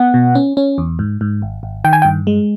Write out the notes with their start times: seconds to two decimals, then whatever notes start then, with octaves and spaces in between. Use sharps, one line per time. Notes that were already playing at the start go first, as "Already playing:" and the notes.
Already playing: B3 F#5
0.14 B2
0.35 C#4
0.57 C#4
0.78 E2
0.99 G#2
1.21 G#2
1.42 G#1
1.63 G#1
1.84 D#3 G5
1.93 G#5
2.02 G5
2.05 G2
2.27 G#3